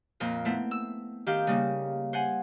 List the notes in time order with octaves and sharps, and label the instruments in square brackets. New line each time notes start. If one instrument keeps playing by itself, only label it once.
[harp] F2 A#2 C4 F4
A3 B3 C4 E4
E6
D#3 G4 F5 G6
C#3 G3 A#3 D#4
C5 F#5 G#5